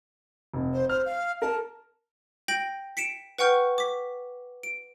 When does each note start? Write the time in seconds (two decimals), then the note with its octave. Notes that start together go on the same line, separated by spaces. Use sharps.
0.54 F1
0.73 C5
0.89 C5 F6
1.06 F5
1.42 A#4 A5
2.48 G5 G6 A#6 D7 F#7
2.97 B6 C#7 D7 E7
3.38 B4 F#5 G5 C#6 F6 G6
3.78 D6 B6
4.63 D7